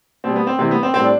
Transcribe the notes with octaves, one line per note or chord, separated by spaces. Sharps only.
B2 G3 C4
B3
C4
C3 E3 G3 C4
B3
C4
A2 G3 C4
D4